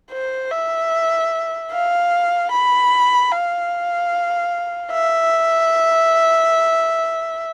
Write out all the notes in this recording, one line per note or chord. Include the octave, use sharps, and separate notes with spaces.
C5
E5
F5
B5
F5
E5